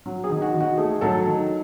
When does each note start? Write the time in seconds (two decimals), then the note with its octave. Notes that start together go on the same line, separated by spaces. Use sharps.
0.06 F#3
0.24 G#4
0.30 D#3
0.42 F#4
0.54 D#3
0.60 F#4
0.77 A3 G#4
1.01 F#3 A4
1.26 D#3